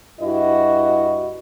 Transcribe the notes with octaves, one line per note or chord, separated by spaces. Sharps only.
G2 E4 F#4 D#5